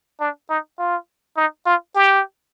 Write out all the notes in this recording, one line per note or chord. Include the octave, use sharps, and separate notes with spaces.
D4
D#4
F4
D#4
F4
G4